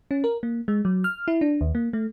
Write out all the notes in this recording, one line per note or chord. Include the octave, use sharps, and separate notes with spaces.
C#4
A#4
A#3
G#3
F#3
F6
E4
D4
D#2
A#3
A3